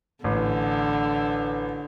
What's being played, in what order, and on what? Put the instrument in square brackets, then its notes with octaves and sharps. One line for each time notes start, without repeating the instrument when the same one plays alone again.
[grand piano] A1 [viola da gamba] D3